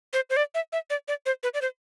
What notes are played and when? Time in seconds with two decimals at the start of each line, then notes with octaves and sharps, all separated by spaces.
0.13 C5
0.30 C5
0.37 D5
0.55 E5
0.73 E5
0.90 D5
1.08 D5
1.26 C5
1.43 B4
1.54 D5
1.62 C5